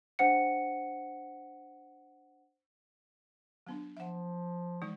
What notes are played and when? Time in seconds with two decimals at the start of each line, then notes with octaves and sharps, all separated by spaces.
0.19 D4 C5 F#5 C#7
3.67 F#3 B3 D4
3.97 F3 E5 F#5
4.82 E3 G#3 D#4